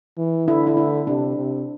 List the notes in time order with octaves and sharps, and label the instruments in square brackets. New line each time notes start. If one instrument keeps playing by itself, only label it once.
[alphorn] E3
[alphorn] D3 [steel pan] E4
[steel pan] E4
E4
[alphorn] C3 [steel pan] D4
[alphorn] C3